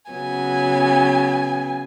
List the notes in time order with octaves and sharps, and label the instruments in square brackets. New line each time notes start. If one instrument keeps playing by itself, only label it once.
[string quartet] C#3 F#3 B3 [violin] G#5